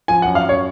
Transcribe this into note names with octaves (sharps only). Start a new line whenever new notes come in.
F3 G#5
F#5
F#2
F5
F#2 C#5